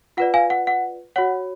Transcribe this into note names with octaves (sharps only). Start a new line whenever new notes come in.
F4 B4 D5 F#5
F5 G#5
F#5
F#5
F#4 C#5 F#5